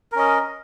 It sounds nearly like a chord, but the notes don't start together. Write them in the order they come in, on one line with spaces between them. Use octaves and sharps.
A#4 C#4 D#5